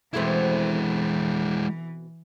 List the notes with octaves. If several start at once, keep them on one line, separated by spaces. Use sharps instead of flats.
B2 E3 G#3 A3 C4 E4